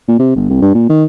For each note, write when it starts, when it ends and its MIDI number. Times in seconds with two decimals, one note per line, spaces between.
0.08 0.17 46
0.19 0.35 48
0.36 0.49 31
0.50 0.59 36
0.62 0.69 43
0.74 0.86 46
0.90 1.04 51